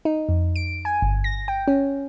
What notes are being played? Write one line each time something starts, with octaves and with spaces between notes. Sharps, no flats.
D#4
F2
D7
G#5
G1
A#6
G5
C#4